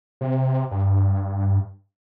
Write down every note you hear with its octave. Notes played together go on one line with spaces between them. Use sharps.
C3
G2